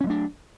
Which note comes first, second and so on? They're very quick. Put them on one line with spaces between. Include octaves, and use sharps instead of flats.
C#4 F#3 A3 D4